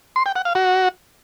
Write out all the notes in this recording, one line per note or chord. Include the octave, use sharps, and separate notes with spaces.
C6
G5
F#5
F5
F#4